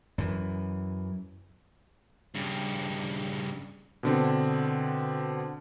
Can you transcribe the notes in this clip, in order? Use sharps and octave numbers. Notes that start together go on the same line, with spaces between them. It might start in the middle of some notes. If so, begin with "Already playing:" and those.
F#2 E3
G2 C#3
B2 D3 C4